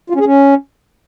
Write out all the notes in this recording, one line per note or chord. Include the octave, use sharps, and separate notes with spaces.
F4
C#4
G#4
C#4